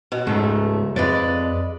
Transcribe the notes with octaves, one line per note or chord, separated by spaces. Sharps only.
B2
C#2 G#2 A3
F2 G#3 B4 D5